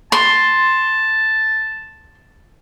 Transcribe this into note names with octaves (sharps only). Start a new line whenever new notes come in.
A5 C6